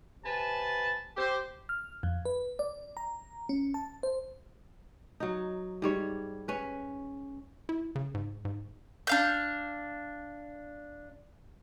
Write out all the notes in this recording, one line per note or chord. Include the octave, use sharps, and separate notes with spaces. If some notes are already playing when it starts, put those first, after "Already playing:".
C3 B4 G#5 A5
G4 C5
F6
F2
B4
D5
A#5
C#4
A5
C5
F#3 D#4
G#2 G3 C#5
C#4 B4
E4
C#3
G#2
G#2
D4 F5 G6